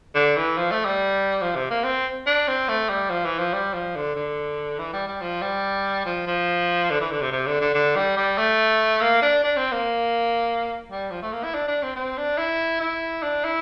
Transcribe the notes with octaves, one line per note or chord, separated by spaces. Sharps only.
D3
E3
F3
A3
G3
F3
C3
A#3
C4
D4
C4
A3
G3
F3
E3
F3
G3
F3
D3
D3
E3
G3
G3
F3
G3
F3
F3
D3
E3
D3
C3
C3
D3
D3
D3
G3
G3
A3
A#3
D4
D4
C4
A#3
G3
F3
A3
A#3
E4
D4
D4
C4
C4
D4
E4
E4
D4
E4